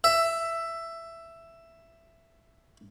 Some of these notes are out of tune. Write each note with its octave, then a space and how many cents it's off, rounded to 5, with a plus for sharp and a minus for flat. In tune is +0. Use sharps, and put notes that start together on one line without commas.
E5 +10